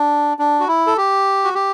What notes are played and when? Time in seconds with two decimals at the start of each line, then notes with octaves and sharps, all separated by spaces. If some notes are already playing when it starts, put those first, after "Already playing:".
Already playing: D4
0.39 D4
0.60 F#4
0.68 E4
0.87 A4
0.97 G4
1.44 F#4
1.55 G4